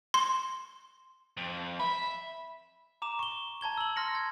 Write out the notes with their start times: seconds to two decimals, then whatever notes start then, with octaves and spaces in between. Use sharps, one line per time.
0.14 C6
1.37 F2
1.80 E5 B5
3.02 A#5 D6 E7
3.19 C#6 G7
3.61 A5 A#5 G#6 G7
3.78 E6 F#7
3.96 C6 F6 A#6 C#7
4.15 G#6